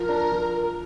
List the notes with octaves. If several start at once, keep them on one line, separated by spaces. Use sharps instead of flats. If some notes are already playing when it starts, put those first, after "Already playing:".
Already playing: F3 A#4
D4
F3